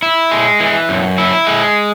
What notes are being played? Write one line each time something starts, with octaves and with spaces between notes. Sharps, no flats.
E4
G#3
E3
F#2
E4
G#3